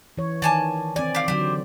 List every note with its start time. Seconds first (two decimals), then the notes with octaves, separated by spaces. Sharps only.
0.18 E3 C#5
0.42 D#3 D5 G#5 A5
0.96 C4 D5 G#5
1.15 G4 F5
1.28 D3 F#3 G4 C5